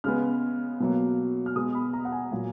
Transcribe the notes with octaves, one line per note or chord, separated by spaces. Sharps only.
C#3 G#3 B3 F6
B2 F#3 A#3
F6
B2 G#3 B3 D#6
B5
A#5
F#5
G#5
A#2 F#3 A#3